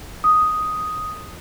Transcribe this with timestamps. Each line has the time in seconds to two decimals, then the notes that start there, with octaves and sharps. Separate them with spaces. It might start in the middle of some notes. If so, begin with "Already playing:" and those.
0.24 D#6